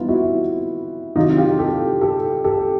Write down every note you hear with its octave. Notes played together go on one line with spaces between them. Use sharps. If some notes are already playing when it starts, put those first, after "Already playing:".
Already playing: E3 G3 B3 D#4 F4
E4 F#4
C3 D#3 F#3 D#4 F4
F4 G4
G4 A4
G4 A4
G4 A4